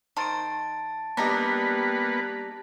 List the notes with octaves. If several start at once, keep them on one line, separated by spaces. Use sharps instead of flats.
D#3 C5 A5 A6 D7
G3 A#3 B3 D4 D#4 G4 B4 A#5